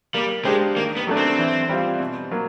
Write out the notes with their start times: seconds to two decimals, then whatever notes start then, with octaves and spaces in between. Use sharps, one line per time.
0.14 G3 A#3
0.45 G#3 D4 G4 C5
0.76 D#3 A#3
0.97 B3
1.07 F#3 A3 D4
1.17 C4
1.38 E3
1.69 G3 C4 F4
2.00 B2
2.31 F#3 A#3